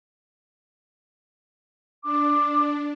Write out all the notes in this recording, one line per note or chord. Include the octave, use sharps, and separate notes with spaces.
D4 D6